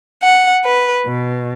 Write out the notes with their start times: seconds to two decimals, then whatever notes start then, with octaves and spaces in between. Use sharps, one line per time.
0.23 F#5
0.64 B4
1.06 B2